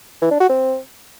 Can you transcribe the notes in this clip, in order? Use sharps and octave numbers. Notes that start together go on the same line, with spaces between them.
E3
D4
F#4
C4